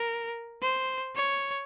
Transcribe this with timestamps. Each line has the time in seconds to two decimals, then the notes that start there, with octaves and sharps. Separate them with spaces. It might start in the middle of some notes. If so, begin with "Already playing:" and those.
Already playing: A#4
0.62 C5
1.15 C#5